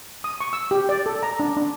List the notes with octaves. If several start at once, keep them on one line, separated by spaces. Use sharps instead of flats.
D#6
C#6
E6
G4
D5
A4
A#5
D4
D4